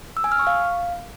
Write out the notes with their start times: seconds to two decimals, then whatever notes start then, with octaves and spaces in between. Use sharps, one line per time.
0.17 E6
0.24 G#5
0.32 F6
0.39 C#6
0.47 F5